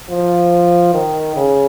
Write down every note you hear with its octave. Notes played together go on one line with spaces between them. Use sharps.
F3
D#3
C#3